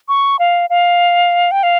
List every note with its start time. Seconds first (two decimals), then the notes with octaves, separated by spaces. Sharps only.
0.08 C#6
0.39 F5
0.70 F5
1.51 G5
1.63 F5